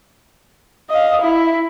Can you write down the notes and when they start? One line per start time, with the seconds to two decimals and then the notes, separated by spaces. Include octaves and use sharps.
0.90 D#5 F5
1.21 E4